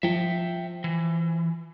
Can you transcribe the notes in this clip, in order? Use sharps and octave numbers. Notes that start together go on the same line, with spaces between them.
F3 E5 G5
E3